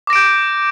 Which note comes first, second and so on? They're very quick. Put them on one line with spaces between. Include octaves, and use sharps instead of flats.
D6 A#6 D7 G6